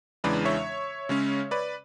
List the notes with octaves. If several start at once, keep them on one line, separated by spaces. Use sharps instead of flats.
E2 C#3 E3 G#3 D4 B4 D5
C#5 E5
C#3 G#3 C#4
B4 D5